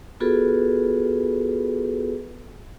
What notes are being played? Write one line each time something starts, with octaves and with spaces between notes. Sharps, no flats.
B3 F4 F#4 G#4 A4 B4